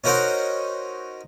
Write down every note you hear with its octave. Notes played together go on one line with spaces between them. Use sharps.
C#4 D#4 F#4 A#4 C5 F#5